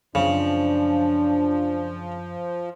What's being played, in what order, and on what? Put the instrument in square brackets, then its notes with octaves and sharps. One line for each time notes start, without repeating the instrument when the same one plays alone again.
[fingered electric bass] F#2 [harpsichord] C#3 [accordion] F3 [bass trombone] D4